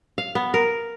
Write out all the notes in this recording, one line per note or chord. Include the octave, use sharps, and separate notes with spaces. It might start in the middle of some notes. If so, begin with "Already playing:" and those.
F5
B3
A#4